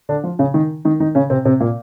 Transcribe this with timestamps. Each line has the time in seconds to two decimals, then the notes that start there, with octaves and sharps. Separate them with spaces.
0.09 D3 D4
0.23 F3 F4
0.39 C#3 C#4
0.54 D#3 D#4
0.85 D#3 D#4
1.00 D#3 D#4
1.15 C#3 C#4
1.30 C3 C4
1.45 C3 C4
1.60 A#2 A#3